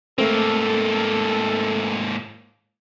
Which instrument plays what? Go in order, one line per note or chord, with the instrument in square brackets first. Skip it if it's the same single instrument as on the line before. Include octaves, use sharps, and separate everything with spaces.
[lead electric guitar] G#2 A#3 [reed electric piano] A3 C4 [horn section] A4